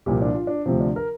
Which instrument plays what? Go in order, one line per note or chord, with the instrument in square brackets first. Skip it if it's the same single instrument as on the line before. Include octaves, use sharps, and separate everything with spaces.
[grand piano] C2 A#2 F3 G4
D4
F4
D4
D2 C3 F3 C4
D4
A#4